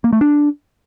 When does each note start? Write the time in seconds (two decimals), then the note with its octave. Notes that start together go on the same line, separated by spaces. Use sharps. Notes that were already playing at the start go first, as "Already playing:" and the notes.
0.04 A#3
0.13 A3
0.21 D4